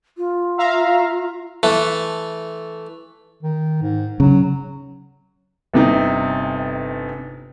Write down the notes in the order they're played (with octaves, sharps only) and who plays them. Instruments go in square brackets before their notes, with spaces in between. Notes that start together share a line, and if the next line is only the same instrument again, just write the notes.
[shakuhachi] F4
[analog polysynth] E5 F5 A#5
[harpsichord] E3 A3
[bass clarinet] D#3
G#2
[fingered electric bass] C#3 [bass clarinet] F#3
[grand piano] G1 C3 D#4